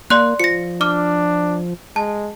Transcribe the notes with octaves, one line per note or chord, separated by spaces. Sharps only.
A#3 D5 C6 F#6
F3 A#6 C#7
D4 D6 F6
G#3 A5